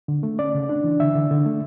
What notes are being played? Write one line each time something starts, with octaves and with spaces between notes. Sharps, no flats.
D3
A3
C#4 D5
C#3
D4
E3
D3 E5
D3
D3
A3